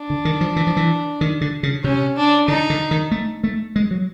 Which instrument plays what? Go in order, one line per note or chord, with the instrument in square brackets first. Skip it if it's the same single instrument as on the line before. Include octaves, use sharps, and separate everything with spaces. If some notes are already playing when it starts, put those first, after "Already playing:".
Already playing: [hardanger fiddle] D4
[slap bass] D3
D#3
F3
E3
F3
E3
D#3
D3
C#3
[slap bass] C3 [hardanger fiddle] C#4
[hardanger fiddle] D4
[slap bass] D3 [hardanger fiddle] D#4
[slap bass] D3
D#3
A3
A3
G#3
F#3